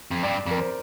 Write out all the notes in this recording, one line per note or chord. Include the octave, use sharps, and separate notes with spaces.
F2
G2 D5
F2 A#4
C5